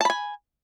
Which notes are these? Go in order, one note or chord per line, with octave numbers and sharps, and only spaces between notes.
G#5 A5 B5